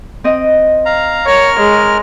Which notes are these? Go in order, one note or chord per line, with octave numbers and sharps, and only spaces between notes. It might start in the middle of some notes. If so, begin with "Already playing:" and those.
C4 D#5
F5 A#5
A#4 C#5 F6
G#3